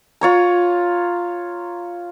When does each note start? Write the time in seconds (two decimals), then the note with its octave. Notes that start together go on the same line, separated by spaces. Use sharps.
0.21 F4 C#5 A#5